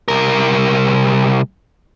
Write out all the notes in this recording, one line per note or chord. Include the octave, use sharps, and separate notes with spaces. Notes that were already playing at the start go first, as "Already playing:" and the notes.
C2 A#4